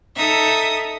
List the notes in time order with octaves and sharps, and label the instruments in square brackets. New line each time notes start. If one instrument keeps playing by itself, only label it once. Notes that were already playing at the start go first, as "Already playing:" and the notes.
[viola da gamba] D#4 A4 [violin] E5 D#6